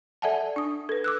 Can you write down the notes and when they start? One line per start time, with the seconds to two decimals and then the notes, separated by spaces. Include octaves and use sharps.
0.22 A4 D5 E5 F#5 G#5 A5
0.56 D4 D#6
0.89 A4 B4
1.04 D6 E6 F#6